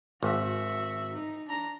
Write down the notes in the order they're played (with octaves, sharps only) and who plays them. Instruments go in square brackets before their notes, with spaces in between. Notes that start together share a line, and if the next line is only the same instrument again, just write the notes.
[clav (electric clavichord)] G#1 [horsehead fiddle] F#4 E5
[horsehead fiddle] D#4
D4 A#5